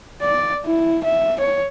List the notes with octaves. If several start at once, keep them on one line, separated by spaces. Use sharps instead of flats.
D5
E4
E5
C#5